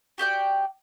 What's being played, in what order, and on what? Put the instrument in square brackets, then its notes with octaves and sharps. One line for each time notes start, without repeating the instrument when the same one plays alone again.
[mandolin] F#4 G4 D5 G5